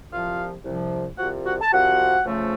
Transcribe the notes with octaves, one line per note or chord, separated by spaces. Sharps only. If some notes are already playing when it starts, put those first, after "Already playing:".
C2 C3 F3 F4 F5
C2 C3 F3
C2 C3 F3 F#4 F#5
F#4 F#5
A5
C2 C3 F3 F#4 F#5
C#3 F3 A3